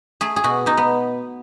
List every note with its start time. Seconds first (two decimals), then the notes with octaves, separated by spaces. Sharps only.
0.21 A3 G#4
0.36 G#4
0.44 B2 F#4
0.66 B2 D#4
0.77 B3